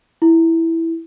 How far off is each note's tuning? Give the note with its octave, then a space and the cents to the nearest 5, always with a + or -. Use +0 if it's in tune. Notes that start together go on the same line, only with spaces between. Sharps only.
E4 +0